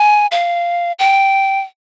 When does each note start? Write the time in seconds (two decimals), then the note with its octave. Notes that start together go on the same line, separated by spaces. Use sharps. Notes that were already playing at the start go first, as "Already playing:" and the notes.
Already playing: G#5
0.31 F5
0.99 G5